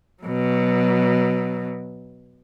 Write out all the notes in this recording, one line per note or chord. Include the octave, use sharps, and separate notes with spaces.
B2 F#3